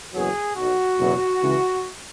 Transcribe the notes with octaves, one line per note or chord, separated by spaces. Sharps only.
F#1 E2 B2 F#3 G#4
B1 B2 F#3 F#4
F#1 E2 B2 F#3
C#2 C#3 E3